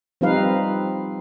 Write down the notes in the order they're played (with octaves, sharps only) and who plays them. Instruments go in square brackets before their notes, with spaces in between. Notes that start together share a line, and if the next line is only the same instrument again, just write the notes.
[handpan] F3 G3 C4 D#4 B4 F5